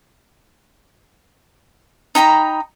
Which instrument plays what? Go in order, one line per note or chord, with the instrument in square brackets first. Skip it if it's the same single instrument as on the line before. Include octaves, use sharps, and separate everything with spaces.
[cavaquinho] D#4 G5 A#5 B5